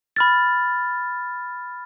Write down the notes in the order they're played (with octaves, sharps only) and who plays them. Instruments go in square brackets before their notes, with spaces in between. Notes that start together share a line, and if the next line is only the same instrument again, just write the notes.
[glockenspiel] B5 F6 A6